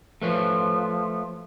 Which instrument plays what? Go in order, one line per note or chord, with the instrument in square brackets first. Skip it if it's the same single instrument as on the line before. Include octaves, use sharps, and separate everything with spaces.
[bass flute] F3 [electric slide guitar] A3 B4 C#5